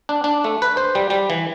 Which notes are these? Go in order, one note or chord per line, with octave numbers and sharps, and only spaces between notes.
D4
D4
A3
B4
C5
G3
G3
E3